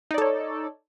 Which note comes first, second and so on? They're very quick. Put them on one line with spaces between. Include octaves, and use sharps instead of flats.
D#4 D5 A4 C#5